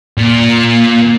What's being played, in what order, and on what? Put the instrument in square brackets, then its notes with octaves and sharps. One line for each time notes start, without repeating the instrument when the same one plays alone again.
[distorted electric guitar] A#2